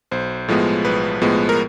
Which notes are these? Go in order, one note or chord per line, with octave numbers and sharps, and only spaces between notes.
B1 C5
A2 F3 G#3 B3
B1 B4
A2 F3 G#3 B3
A#4